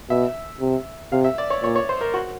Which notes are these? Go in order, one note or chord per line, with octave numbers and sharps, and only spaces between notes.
B2 E5
C3
C3 F5
E5
D5
C#5
A#2 C#5
C#5
C5
A#4
F#4